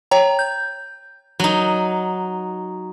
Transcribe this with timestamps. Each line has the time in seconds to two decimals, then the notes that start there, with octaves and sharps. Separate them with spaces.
0.11 C#5 G5 A#5
0.39 G6
1.40 F#3 D#4